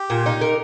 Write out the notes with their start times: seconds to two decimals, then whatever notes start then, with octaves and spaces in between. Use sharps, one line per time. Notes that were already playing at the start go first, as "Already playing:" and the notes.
Already playing: G4
0.10 A#2
0.26 D#4
0.41 A#4